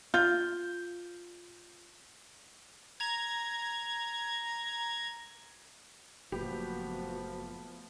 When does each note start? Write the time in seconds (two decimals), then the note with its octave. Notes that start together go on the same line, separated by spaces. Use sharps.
0.14 F4 G6
3.00 A#5 G#6
6.32 F#1 A#2 F3 A3 B3 F#4 G4 B4